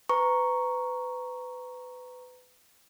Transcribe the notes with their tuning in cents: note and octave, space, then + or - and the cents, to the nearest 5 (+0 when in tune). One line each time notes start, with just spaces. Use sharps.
B4 +30 A#5 +0 C#6 +0